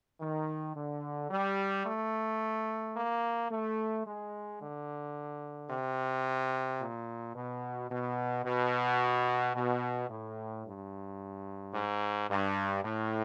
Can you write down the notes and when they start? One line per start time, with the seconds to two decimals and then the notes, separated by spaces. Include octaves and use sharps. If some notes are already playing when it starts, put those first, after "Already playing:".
0.20 D#3
0.75 D3
1.30 G3
1.85 A3
2.95 A#3
3.50 A3
4.05 G#3
4.60 D3
5.69 C3
6.79 A#2
7.34 B2
7.89 B2
8.44 B2
9.54 B2
10.08 A2
10.64 G2
11.74 G#2
12.29 G2
12.84 A2